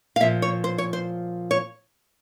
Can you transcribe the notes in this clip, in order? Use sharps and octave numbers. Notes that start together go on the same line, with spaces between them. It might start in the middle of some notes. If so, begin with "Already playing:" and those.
F5
A#2 F3 E5
C#5
C5
C#5
C5
C#5